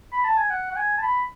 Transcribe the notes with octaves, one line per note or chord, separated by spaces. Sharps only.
B5
A5
G#5
F#5
F#5
G#5
A5
B5